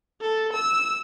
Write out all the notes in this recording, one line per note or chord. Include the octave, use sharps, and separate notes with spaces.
A4
E6